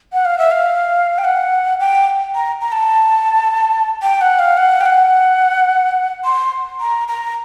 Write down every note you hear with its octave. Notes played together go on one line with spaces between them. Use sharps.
F#5
F5
E5
F5
G5
F#5
G5
A#5
A#5
A5
G5
F#5
F5
F#5
G5
F#5
C6
A#5
A#5